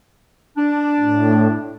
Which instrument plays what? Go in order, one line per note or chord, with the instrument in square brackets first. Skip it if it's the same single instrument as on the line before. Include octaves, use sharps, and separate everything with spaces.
[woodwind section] D4
[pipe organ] A2